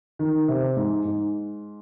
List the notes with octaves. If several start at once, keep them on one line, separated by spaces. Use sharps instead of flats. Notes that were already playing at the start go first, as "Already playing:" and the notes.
D#3
C3
G#2
G#2